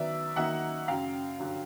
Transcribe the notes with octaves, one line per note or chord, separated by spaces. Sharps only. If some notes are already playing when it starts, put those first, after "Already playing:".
Already playing: D#3 F#3 B3 D5 E5
D#3 F#3 A#3 D#4 E5 F#5
F#2 C#3 F#3 F5 G5
G2 D3 F#3